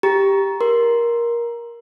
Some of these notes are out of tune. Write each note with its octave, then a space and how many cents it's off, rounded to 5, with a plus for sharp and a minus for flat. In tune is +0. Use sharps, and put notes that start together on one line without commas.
G4 +0 A#5 +15
A#4 +15 C6 +0